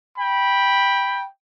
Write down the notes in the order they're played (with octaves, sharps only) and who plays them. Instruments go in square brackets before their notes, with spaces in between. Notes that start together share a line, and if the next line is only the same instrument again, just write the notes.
[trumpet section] G5 B5